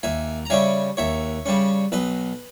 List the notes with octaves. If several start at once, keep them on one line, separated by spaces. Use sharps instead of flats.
D#2 E5 G#5
A#5
C#3 G3 C#4 E5 G#5
D#2 C#5 E5
C#3 G3 C#4
B1 B4 D#5